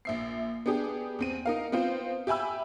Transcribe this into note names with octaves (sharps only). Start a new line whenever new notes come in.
A#1 E5 C7
B3 D4 G4 G#4
E2 C4 D#7
D#4 A#4 F5
B3 C4 F4 C5
G4 E5 G#5 B5 E6